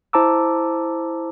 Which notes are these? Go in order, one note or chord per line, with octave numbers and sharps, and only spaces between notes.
E4 C5 A5 A#5 D6 E6